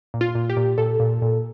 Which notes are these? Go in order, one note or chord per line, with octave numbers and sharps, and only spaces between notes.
A#2
F4
A#2
G4
A#2
A#2 A4
A#2
A#2